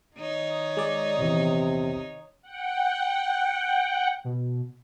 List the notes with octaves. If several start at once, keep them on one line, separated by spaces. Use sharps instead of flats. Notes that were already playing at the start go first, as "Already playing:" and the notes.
D#3 D#4 C#5
G#3 D5
A#1 E2 C3
F#5 G5
B2